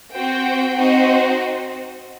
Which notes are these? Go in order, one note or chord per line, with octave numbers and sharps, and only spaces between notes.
C4 F#4 C5 G5
C4 D#4 F#4 C5 D#5